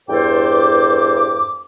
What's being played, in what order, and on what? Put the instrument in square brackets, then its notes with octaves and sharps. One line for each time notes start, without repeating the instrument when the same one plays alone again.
[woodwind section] E2 G2 A4 C5 G5 D6